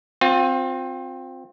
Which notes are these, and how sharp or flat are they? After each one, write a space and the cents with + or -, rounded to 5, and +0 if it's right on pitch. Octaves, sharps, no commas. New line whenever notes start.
C4 +0 F4 +30